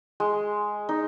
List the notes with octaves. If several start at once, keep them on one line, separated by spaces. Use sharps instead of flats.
G#3
D#4